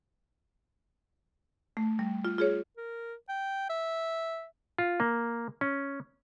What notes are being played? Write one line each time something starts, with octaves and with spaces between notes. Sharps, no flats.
A3
G3
F4
F4 G#4 C#5
A#4
G5
E5
F4
A#3
C#4